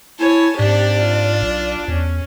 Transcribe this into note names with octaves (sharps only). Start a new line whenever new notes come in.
E4 C#5 G#5 A5
G#2 C3 D4 G4 D5
F4
B1
E2 C#4